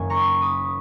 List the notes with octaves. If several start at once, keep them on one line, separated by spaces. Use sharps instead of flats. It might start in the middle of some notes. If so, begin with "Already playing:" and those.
Already playing: F#1 F#2 D#3 A#3 C#4 G#5
A#5 C#6
B5 D#6